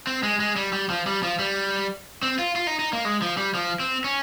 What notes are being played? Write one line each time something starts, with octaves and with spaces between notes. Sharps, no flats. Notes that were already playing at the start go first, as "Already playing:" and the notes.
C4
G#3
G#3
G3
G3
F3
G3
F3
G3
C4
F4
F4
D#4
D#4
A#3
G#3
F3
G3
F3
C4
C#4